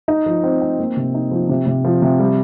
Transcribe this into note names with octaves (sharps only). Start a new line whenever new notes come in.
D#4
F3
C4
C4
A#3
C3
D#4
F3
C3
C3
F3
C3
G3